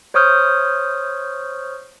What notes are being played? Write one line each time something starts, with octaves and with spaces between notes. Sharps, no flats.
C5 C#5 C#6 D#6 F6 G6